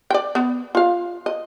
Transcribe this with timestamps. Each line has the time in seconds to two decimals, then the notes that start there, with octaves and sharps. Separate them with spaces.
0.10 D5 G5
0.35 B3
0.75 F4 F5
1.26 D#5